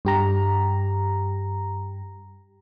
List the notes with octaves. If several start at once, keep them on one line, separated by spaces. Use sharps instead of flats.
G2 G4 A#5